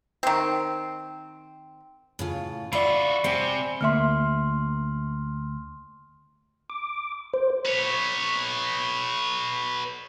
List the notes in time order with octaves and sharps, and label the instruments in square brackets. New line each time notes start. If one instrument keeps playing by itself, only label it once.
[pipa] D#3 C4
[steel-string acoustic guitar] A2 C#3 F4
[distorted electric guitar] F4 F#4 [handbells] D5 B5 [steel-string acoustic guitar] E5
[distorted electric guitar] C3 [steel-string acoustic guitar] C4 E5 G#5
[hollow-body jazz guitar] D2 A#3 E5 [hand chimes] C6 F6
[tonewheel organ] D6
C5
[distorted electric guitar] B4 C#5